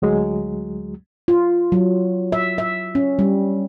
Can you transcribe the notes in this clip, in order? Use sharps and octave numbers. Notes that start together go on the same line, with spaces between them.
D2 F#3 G#3
F4
F#3
E5
E5
C#4
G3